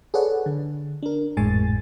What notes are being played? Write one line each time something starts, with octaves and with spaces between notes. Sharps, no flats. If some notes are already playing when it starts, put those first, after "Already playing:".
G#4 A4 B4 C#5 D5 F#5
D3
D4 A#4
G#1 F2 A2 G#3 G#5 A6